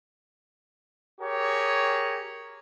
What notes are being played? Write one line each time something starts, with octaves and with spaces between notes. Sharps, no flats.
G4 G#4 A#4 C#5